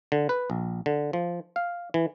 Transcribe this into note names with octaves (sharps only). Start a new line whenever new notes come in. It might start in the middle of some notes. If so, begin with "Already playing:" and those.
D3
B4
A#1
D3
F3
F5
E3